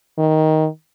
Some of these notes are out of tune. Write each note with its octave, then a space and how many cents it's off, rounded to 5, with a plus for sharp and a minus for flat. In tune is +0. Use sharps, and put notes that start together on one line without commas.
D#3 +10